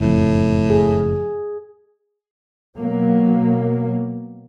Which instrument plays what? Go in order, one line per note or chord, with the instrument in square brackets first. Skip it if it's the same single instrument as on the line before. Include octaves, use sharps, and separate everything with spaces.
[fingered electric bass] F#1 F2 [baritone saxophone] A2
[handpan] G#4
[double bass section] B2 F#3 A#3